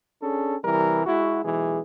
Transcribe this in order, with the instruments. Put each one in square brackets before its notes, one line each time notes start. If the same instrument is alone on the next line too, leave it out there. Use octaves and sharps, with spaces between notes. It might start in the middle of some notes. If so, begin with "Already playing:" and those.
[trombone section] C#4 D4 G#4 A4
C2 E3 G3 A#4
G#3 E4 F#4
B1 E3 G#3 G#4